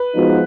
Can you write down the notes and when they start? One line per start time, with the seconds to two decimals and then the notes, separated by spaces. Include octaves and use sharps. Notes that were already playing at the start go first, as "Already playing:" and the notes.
Already playing: B4
0.15 F3 G#3 B3 D#4 F#4